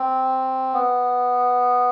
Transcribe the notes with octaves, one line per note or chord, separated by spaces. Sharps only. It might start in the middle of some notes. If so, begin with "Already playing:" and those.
Already playing: C4
B3